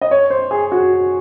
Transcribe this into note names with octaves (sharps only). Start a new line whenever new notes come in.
D#5
C#5
C5
G#4
F#4